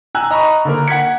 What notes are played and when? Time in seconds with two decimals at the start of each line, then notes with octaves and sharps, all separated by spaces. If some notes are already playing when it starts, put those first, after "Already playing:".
0.15 G#5 A#5 E6 F#6
0.31 D#5 A#5 B5 C#6
0.65 D3 A#3 A#4
0.88 F#5 G#6 B6 C#7